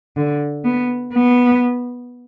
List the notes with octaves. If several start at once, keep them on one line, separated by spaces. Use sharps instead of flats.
D3
B3
B3